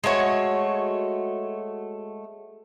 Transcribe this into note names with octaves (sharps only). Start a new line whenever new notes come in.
G#3 A3 F#4 C#5